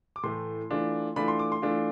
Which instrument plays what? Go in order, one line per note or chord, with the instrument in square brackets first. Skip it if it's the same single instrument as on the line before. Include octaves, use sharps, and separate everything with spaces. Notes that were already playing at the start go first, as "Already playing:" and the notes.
[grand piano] D6
A2 E3 A3 C6
E3 A3 D4 F4
E3 A3 D4 F4 B5
C6
D6
C6
E3 A3 D4 F4